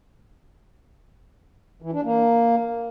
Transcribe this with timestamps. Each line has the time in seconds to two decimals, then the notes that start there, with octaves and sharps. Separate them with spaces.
1.82 E3
1.93 D4
2.04 A#3